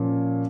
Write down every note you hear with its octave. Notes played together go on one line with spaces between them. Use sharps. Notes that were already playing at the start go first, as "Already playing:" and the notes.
Already playing: A#2 F3 C#4